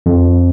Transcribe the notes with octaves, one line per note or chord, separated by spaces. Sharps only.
F2